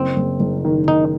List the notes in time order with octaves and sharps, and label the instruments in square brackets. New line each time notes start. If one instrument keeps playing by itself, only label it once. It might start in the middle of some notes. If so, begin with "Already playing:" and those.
Already playing: [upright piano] F#1 [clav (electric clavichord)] C4
[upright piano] F#1
F#1
D#3
[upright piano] D#3 [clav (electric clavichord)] D#4